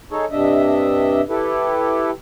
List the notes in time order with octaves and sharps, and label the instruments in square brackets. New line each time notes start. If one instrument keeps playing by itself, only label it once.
[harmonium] D#4 G#4 A4 C#5
G2 C3 D4 D#5 E5
E4 G4 A4 B4